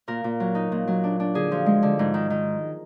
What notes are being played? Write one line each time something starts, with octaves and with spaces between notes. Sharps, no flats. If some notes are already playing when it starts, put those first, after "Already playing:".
A#2 A#4
A#2
F#3
D#4
A#2
F#3
D4
D4
D3 G#4
F3
G#3
D3
G#2
D#3
D#3